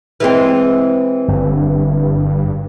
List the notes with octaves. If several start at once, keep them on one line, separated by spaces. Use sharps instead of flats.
E3 G#3 C4
G1 G2